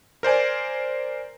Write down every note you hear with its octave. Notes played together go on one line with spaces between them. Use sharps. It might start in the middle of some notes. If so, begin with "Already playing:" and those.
A#4 C5 D5 G#5